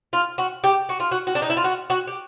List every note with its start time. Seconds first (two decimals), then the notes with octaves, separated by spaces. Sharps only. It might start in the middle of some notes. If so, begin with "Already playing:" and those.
0.13 F4
0.38 F#4
0.64 G4
0.89 F#4
1.00 F4
1.12 F#4
1.27 F#4
1.35 D4
1.42 D#4
1.50 E4
1.57 F4
1.64 F#4
1.90 F#4
2.07 G4